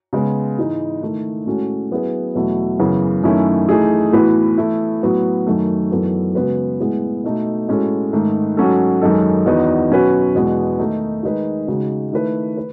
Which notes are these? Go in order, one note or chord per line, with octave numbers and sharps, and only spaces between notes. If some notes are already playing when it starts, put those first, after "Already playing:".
C#3 G#3 B3
G#2 E3 G#3 D#4
D#3 A3 E4
A2 G#3 C#4 F#4 A4
F#3 B3 E4 G#4 B4
E2 B2 F#3 A3 E4
F#2 C#3 E3 B3 F#4
F#2 D#3 A3 C#4 E4
E3 A3 D#4 G#4
A2 E3 B3 F#4 B4
E3 A3 E4
A2 F#3 B3 F#4
F#2 D#3 A3
F#2 E3 B3 D#4 A4
C#3 G#3 B3 F#4 B4
A2 G#3 B3 E4 G#4
B2 A3 D#4 A4
A2 G#3 C#4 F#4 A4
G#2 D#3 A3
G#2 F#3 C#4 F#4 A4
F#2 D#3 G#3 D#4 A4
E2 D#3 F#3 B3 D#4
B2 F#3 C#4 F#4 B4
E2 B2 G#3 B3
D#3 A3 D#4
D#3 G#3 D#4 G#4 B4
C#3 G#3 D#4 F#4
D#3 A3 E4 B4
B4